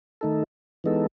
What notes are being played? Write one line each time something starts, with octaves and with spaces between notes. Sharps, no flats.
D#3 A3 D#4 A4
E3 G#3 B3 D#4 A4